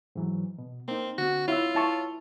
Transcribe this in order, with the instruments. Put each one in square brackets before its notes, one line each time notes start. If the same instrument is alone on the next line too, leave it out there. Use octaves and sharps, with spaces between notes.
[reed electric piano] G#2 E3 F#3
B2
[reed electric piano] A#3 D#4 [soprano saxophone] C4
[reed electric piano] D3 C4 [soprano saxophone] F#4
[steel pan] E4 [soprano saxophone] F4 [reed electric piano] C#5 E6
[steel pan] E4 A5 C#6